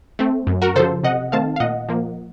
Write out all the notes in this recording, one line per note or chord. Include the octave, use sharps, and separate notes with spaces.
A3 C4
F#2
F#4 A#4
C#3 F3 A4 C5
C3 D#5 F#5
D#3 A3 C4 F5 A5
F5
A#2 D#5 F#5
F3 A#3